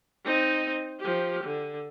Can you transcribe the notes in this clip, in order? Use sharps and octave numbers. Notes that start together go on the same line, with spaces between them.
C4 D#4
F3 G4
D3